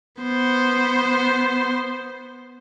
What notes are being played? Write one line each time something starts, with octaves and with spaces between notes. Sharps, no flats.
B3 C5